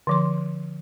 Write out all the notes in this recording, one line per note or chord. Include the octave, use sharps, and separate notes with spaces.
D3 F3 C6